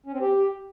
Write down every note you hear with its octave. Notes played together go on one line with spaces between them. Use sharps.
C#4
C4
G4